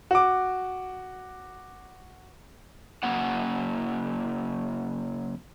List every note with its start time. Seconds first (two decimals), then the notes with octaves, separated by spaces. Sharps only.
0.11 F#4 D6
3.03 C#3 F#3 A#3 F#5